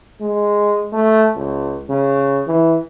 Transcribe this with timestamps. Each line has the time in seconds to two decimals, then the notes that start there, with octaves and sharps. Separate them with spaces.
0.21 G#3
0.92 A3
1.36 C#2
1.89 C#3
2.47 E3